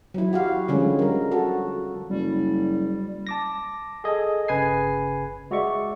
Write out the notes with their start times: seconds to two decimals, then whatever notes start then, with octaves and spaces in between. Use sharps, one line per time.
0.14 F#3 E4
0.33 F#4 G4 F5
0.68 D3 F3 G3 G#3 C#4
0.99 G3 A#4
1.31 F#4 A4
2.09 F#1 G3
3.27 A5 D6 A#6
4.04 G#4 A4 D#5 G#5
4.48 G1 C#3 B4 G#5 G#6 C7
5.51 G#3 F#4 D5 E5 C#6